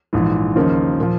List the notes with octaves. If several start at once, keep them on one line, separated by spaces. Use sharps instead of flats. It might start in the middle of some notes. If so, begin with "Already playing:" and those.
A#1 G#2 E3
D#2 C#3 F3 A#3 D#4
A#2 F3